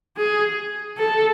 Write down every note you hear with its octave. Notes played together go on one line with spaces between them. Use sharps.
G#4
A4